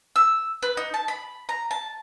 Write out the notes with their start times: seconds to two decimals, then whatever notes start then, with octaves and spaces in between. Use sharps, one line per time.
0.16 E6
0.63 B4
0.77 D#4
0.94 A5
1.08 B5
1.49 A#5
1.71 A5